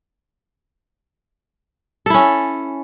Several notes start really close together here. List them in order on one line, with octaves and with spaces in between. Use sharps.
A4 E4 C#4